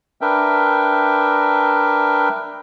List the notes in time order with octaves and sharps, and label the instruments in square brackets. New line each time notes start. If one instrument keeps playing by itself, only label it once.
[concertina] D4 A#4 B4 E5 G5